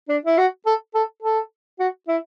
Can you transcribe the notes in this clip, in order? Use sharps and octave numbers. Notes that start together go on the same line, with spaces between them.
D4
E4
F#4
A4
A4
A4
F#4
E4